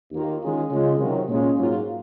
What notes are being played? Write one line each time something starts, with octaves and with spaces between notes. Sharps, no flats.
D#2 D#3 A#3 F4
D#3 G#3 C#4 F4 G#4
C#3 G#3 C#4 F4
C3 D#3 F#3
A#2 G#3 C#4 F4
G#2 F#3 A#3 F4